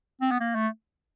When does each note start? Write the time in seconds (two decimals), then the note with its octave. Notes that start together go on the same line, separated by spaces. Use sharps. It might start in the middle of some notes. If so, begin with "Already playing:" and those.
0.21 C4
0.31 B3
0.40 A#3
0.55 A3